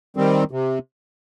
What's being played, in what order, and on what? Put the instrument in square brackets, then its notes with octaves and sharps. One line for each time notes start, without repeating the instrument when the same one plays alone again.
[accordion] D#3 G3 C4
C3